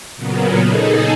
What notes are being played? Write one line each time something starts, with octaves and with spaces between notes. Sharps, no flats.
A#2 C#3 F#3 A#3 B3
D#4 G#4 A4